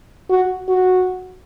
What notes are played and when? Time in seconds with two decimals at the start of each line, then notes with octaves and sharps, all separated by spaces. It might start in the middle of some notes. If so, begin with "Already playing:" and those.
0.30 F#4
0.68 F#4